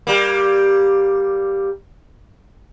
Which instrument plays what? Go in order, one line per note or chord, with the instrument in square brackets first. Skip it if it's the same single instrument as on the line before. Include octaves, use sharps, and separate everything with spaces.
[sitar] G3 A#3